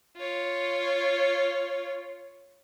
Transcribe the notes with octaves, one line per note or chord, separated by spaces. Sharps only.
F4 C#5